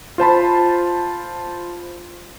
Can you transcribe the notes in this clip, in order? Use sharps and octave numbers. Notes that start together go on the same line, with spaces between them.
F4 C5 A5 B5